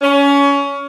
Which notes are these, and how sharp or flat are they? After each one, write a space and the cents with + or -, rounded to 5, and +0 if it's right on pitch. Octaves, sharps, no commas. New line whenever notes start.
C#4 +25